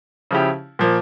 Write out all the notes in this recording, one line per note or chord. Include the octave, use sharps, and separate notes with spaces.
C#3 F3 C#4 E4 G4
A#2 F3 A#3